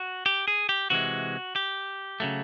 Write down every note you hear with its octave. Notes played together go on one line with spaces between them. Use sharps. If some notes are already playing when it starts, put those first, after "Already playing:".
Already playing: F#4
G4
G#4
G4
C3 E3 G#3 F#4
G4
C#3 F#3 A3